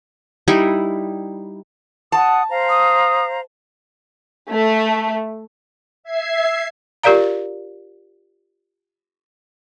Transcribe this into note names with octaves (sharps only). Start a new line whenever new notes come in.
G3 D#4 E4
F#5 A5 D#6
C5 F5 A#5
D#6
A3
E5 G#6 C7
F4 G4 A#4 D5 F5 A#5